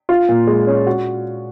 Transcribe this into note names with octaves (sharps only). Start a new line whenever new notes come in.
F4
A#2
G#3
C#4
F#4